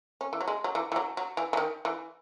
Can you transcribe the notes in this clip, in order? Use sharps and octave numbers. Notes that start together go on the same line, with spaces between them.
C#4
E3
F#3
G#3
F#3
E3
E3
F#3
F#3
E3
E3
D#3
E3